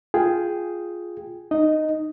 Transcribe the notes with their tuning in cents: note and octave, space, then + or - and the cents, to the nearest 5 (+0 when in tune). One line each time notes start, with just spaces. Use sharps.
F4 +0 G#4 +0 G5 +0
D#4 -20 D#5 +0